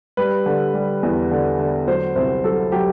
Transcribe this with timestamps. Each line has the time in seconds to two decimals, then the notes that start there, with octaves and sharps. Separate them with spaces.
0.17 G3 B4
0.46 D3
0.74 G3
1.03 E2
1.31 D3
1.59 D3
1.87 F#3 C5
2.16 C2 C5
2.44 F#3 A4
2.72 F#3 G4